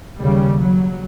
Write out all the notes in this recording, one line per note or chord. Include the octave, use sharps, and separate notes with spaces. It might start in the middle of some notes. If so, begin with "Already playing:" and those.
D#2 C#3 G3
F#3